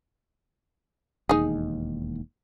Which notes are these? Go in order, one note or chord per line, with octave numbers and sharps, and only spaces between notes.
E1 D#2 D#4 G#4